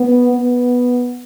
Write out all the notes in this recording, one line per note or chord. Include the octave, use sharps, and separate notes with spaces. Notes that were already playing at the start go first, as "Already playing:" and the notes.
Already playing: B3
B3